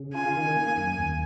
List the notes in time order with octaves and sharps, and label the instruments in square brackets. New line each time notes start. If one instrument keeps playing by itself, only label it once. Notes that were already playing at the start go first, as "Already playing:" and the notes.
Already playing: [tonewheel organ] C#3
[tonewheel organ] F4 [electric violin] G#5
[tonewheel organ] D#3
A#3
F#2
D#2